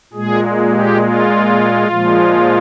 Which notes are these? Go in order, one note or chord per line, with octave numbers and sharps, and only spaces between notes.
A#2 G#3 G#4
G4
F4
A#2 F3 G#3